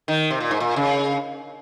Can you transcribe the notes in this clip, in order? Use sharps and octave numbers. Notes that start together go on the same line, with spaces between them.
D#3
C3
A#2
G#2
A#2
C#3